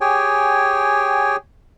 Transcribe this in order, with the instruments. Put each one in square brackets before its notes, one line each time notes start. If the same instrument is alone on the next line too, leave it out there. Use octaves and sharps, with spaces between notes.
[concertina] G4 G#4 C#5 G5 G#5